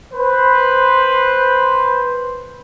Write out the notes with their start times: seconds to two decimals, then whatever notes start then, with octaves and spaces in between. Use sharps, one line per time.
0.14 B4 C5